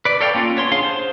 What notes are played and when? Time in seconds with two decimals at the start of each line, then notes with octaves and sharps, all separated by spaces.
0.05 B4 D5
0.21 A4 C#5 D5 F5 G5
0.34 A#3 C#4 F4
0.56 B3 C#5 C6
0.72 D4 G#4 F5 C6
0.85 C5